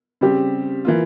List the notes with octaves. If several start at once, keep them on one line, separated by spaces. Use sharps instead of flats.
C#3 G3 C4 G4
E3 A#3 F4